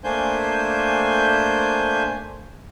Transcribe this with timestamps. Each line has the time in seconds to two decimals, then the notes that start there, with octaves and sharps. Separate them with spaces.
0.04 A3 A#3 D4 C5 G#5 G6